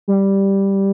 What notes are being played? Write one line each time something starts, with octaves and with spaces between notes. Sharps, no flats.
G3